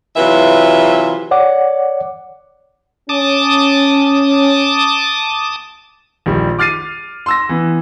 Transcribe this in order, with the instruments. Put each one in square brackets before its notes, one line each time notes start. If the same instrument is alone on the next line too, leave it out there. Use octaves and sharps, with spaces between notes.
[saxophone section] C3 E3 F#3 F4 B4 E5
[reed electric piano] C#5 D5 F#5 D6
[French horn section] C#4 [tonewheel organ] A5 D6 D#6
[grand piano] A#1 D#3 G3
D6 F6 A6 C7 D#7
C6 E6 A#6
E3 B3